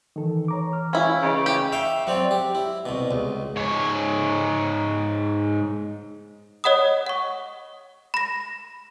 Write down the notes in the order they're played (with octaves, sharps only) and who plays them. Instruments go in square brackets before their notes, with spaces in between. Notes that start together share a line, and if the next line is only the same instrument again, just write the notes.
[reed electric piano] D#3 A4 [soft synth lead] E3
[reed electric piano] C#5 A#5 D6
F6
[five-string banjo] C#4 E4 [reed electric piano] F4 F5
[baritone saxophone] C#3 [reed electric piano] B4 D#5 G6
[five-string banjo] G4
[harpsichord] E5 F5 G5 C#6
F#3 C4 D5
G4
E4
C2 B2
C#2
[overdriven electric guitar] G#2 C#5
[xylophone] C#5 D#5 F#5 B5 D#6
F#5 C#6
B5 A#6